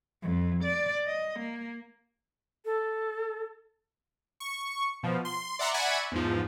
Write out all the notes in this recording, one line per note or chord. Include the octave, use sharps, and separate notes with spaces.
F2
D5
D#5
A#3
A4
C#6
B2 F3
C6
D5 E5 F#5 A#5 C6 D6
D5 E5 F#5 G#5 B5 C#6
E2 G#2 F3